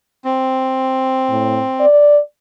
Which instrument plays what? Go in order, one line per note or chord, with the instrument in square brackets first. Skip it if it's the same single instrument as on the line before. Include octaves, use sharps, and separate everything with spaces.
[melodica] C4
[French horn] A2
D5